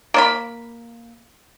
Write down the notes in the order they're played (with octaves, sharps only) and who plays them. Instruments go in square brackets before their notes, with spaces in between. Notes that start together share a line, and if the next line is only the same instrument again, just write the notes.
[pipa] A#3 D5 B5